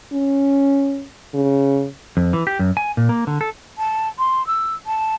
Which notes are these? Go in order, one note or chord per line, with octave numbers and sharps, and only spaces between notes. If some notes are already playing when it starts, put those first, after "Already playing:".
C#4
C#3
F2
E3
G4
F#2
G#5
A#2
A#3
D3
A4
A5
C6
E6
A5